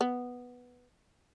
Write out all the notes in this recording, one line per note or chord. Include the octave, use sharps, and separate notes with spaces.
B3